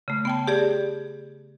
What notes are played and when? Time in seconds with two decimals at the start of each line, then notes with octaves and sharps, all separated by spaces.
0.08 C#3 A3
0.25 B3 G5 A5
0.47 G4 G#4 D5